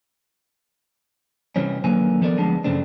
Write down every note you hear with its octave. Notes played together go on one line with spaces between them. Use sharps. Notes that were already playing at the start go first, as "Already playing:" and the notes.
C3 E3 G3 C4 C#4
D#2 D3 F#3 A#3 B4 G#5
F3 B3 A4 A#4 C#5 D5
D2 F3 G#3 B3 D4 A5
F#2 A2 C#3 A3 C4 D4